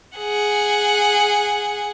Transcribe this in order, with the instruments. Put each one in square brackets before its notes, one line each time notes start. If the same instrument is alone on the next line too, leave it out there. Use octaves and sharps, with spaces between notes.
[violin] G#4 F#5